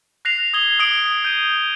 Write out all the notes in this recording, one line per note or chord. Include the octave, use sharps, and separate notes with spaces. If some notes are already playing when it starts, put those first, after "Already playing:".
F#6 A#6 C7 F7
D#6 G#6 G7
D#6 D7
G6 D#7